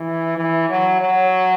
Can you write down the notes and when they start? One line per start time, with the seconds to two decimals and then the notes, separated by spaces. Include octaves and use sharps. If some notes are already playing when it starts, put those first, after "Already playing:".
Already playing: E3
0.37 E3
0.69 F#3
1.01 F#3